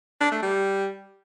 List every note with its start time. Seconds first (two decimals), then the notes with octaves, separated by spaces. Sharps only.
0.21 D4
0.32 A3
0.42 G3